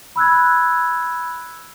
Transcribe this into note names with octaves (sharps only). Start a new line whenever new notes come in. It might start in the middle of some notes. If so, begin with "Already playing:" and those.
B5 E6 F#6 G#6